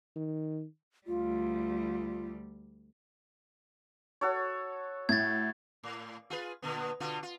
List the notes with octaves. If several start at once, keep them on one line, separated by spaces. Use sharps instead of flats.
D#3
D2 G3 F4
F#4 A4 C#5
A2 G#6 A6
A2
F4 G#4 B4
A#2 D3 B3
B2 D3 F4
F4